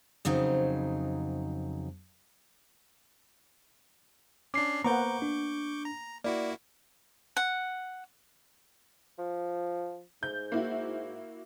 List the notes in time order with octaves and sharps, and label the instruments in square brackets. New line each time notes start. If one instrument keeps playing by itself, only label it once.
[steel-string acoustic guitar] F2 C#3 F#3 D#4 C5
[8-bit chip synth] C#4 D4 [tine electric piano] D6 C7
[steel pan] A#3 B3 [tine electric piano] C5 A#5 [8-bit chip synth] C#6 D6 G6
[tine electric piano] D4
[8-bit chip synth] A#5
[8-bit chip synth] A#3 E4 F#4 [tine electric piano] D5
[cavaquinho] F#5
[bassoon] F3
[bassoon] G#2 [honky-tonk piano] G6
[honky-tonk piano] A#3 E4 F#4